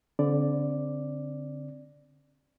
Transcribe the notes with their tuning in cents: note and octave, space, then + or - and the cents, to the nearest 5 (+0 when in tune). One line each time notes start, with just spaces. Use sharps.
D3 -30 C4 +0 D5 +0